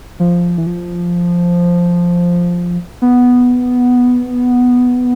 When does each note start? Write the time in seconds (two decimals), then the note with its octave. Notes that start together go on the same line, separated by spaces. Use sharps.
0.20 F3
0.58 E3
0.67 F3
3.02 B3